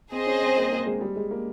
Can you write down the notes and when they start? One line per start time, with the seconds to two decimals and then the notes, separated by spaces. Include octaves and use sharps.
0.12 C4 G#4 C5 D#5
0.27 C#4
0.42 C4
0.57 A#3
0.72 A#3
0.86 G#3
1.01 G3
1.16 G#3
1.31 A#3